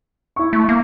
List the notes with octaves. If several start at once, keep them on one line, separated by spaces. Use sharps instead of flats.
E4 C#6
A3
A#3